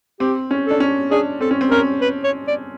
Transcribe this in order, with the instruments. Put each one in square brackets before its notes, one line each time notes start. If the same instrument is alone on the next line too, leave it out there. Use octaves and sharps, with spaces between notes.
[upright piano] C4 [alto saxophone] G4
[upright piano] C#4
[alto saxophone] A4
[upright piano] D4
C#4
[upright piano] D4 [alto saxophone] G#4
[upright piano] C4 [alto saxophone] A4
[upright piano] C#4
C4
[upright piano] C#4 [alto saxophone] A#4
[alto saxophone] B4
C#5
D5